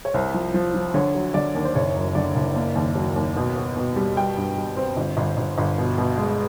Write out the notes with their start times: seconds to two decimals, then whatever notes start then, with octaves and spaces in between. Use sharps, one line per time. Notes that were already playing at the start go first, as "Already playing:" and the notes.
0.05 C#5
0.14 C2 C5
0.34 F3
0.54 F3
0.74 F3
0.94 D3 C#5
1.15 F#3
1.34 D3 D5
1.55 D#2
1.65 C5
1.75 F#1 C#5
1.95 F#2
2.15 D3 D5
2.35 F#1
2.56 A#3
2.75 D#2
2.96 F#3
3.16 D#2
3.36 B2
3.56 B3
3.77 B2
3.96 G3
4.16 G3 G5
4.37 G2
4.57 G3
4.77 C4
4.97 G1
5.17 G1
5.37 G1
5.58 G1
5.78 B2
5.98 B2
6.18 G#3